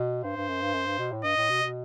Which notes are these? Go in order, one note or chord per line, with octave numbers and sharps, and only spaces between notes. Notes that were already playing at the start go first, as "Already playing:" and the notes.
Already playing: B2
G2 C5
G2
F#2
G2
F#2
G2
B2
A2
G2 D#5
A2
B2
B2